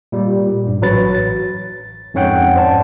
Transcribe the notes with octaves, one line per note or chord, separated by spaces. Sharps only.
A#2 G3
G2
A1 F#3 B4 A6
A6
F2 G#2 C#4 C#5 F#5 G5
C5 D5 A5